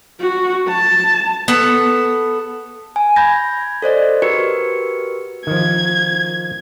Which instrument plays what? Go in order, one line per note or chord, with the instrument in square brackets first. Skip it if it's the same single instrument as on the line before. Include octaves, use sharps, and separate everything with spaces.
[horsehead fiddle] F#4
A5
[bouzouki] B3 A4
[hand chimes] G#5
B5 G6 G#6 A#6
A4 C5 D5 D#5
F#4 G4 A#4 B4 C#7
[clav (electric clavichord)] D#3 F3 [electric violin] G#6